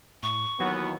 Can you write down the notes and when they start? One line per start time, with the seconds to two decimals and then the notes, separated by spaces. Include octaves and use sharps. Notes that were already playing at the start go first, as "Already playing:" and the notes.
0.23 A2 C#6
0.60 D#2 E3 F#3 B3 F#4